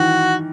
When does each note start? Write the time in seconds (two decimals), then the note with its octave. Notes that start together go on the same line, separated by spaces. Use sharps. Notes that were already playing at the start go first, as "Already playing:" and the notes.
Already playing: D#3 E3 F#4